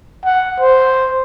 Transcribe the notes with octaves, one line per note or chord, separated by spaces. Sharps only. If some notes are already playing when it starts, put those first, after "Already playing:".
F#5
C5